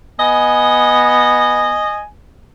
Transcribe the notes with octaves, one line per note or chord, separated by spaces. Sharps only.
B3 D#5 G#5